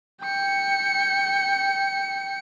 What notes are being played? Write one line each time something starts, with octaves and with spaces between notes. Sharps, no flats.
G5 C#7